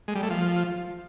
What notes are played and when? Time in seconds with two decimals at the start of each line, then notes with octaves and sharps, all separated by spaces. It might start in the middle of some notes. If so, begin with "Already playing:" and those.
0.08 G#3
0.15 G3
0.23 A3
0.30 F3